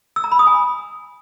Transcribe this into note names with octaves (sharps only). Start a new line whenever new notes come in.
E6
A#5
B5
D#6
G#5